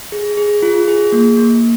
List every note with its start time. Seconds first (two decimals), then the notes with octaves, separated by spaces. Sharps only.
0.12 G#4
0.37 G#4
0.63 F4
0.88 G#4
1.12 A#3
1.37 A#3